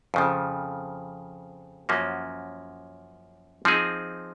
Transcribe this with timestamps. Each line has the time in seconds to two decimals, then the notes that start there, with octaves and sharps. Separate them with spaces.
0.14 F2 C#3 F3
1.89 F#2 F3 A#3 C#4 F#4
3.65 F3 C4 D#4 G#4